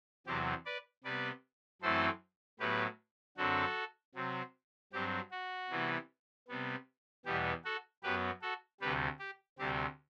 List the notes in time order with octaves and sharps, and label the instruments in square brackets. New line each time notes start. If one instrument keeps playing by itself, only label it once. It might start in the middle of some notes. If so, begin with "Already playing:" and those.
[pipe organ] E2 C3 F#3 C4 G4
B4 D5
C3 G3 B3 B4 D5
F#2 E3 A3 C4 A4 C5
A2 F#3 B3 G4 B4
F#2 D3 F#3 C4 F#4 A4
C3 F#3 C4
G2 F#3 C4 G4
F#4
C3 E3 G3 B3
C3 G3 B3
E2 B2 G3 B3 G4
F#4 A4
F#2 F#3 B3 G4 B4
F#4 A4
D2 C3 G3 G4 B4
G4
D2 C3 G3 C4 G4